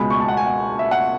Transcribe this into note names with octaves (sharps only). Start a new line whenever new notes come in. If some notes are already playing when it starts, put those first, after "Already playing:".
Already playing: C#2 B2 G#3 B5
C#6
A5
F#5
G#5
F#5
E5
F#5